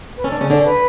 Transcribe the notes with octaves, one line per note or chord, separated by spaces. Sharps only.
B4
C#4 A4
D4
C#3 C#4
D3 D4
B4